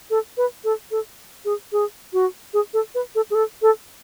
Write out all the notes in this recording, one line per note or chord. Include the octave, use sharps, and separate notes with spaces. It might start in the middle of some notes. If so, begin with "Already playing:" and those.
A4
B4
A4
A4
G#4
G#4
F#4
G#4
A4
B4
A4
G#4
A4
A4